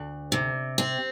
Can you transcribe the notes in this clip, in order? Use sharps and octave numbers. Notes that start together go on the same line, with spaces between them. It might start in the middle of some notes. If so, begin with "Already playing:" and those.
Already playing: D2
C3
C4